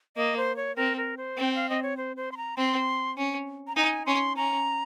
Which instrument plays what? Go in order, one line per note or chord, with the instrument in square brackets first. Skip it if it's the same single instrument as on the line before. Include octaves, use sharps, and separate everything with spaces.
[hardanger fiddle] A#3 [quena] D#5
[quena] C5
C#5
[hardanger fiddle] C4 [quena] A#4
[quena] A#4
C5
[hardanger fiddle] C4 [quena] G5
[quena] F5
D#5
C#5
C5
C5
C6
A#5
[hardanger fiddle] C4 [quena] C6
[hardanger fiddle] C#4
[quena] A#5
[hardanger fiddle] D#4 [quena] G#5
[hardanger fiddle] C#4 [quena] C6
[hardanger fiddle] C#4 [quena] A#5